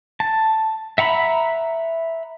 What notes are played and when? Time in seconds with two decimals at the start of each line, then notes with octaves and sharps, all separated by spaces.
0.20 A5
0.98 E5 F#5 A#5 B5